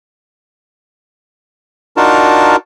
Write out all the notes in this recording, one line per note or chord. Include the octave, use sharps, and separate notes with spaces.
D4 D#4 F4 F#4 A#4 A5